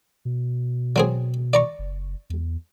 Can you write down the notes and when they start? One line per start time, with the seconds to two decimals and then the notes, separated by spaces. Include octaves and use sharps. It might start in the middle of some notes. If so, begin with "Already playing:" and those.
0.25 B2
0.96 F#3 C4 G#4
1.53 D5 A#5 C#6
1.79 F#1
2.30 E2